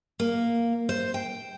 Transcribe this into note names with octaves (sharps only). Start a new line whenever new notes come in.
A#3
C5
G5